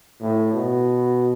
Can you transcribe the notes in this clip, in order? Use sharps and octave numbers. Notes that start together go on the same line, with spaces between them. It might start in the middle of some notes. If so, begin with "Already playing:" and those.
A2
B2